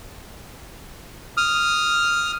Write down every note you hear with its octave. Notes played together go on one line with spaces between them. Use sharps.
D#6 F6